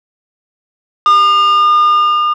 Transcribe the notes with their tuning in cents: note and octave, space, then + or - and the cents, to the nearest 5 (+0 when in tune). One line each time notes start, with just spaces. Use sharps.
D#6 -45